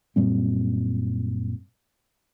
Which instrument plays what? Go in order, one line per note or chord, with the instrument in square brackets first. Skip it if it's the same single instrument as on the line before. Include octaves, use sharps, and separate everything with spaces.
[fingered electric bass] F#2 A#2 G3 C4